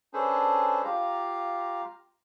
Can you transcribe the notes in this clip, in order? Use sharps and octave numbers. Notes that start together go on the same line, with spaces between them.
C#4 D4 G#4 A4 B4 C5
F4 G4 F5 A#5